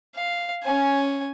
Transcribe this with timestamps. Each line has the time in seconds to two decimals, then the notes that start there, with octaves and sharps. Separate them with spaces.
0.16 F5
0.64 C#4 G#5